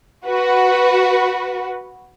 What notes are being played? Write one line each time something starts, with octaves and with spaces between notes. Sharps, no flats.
F#4 B4